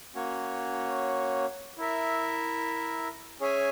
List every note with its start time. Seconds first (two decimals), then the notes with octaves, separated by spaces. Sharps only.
0.15 A#3 C#4 F#4 C#5
1.78 E4 A#4 E5
3.40 C#4 G#4 C#5 E5 G#5